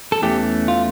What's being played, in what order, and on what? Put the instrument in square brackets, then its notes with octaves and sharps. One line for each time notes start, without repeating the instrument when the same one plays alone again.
[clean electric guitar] A4
E2 E3 A3 C#4 G4
F4